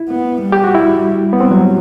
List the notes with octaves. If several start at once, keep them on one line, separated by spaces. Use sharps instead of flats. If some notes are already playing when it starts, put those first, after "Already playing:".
Already playing: E4
B3
G3
G4
F#4
E4
B3
G3 C4
F#3